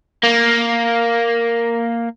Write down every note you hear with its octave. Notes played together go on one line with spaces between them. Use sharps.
A#3